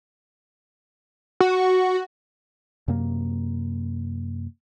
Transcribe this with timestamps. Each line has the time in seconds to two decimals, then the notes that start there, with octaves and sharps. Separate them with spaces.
1.41 F#4
2.88 F#2 C3 A#3